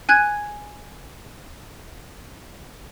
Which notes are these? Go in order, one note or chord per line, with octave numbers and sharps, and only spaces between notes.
G#5 F#6 G#6